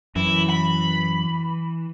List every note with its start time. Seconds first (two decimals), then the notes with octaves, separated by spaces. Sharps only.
0.16 F#2 E3 E4
0.50 B5